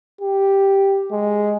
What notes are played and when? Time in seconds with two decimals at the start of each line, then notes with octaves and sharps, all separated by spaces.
0.21 G4
1.11 G#3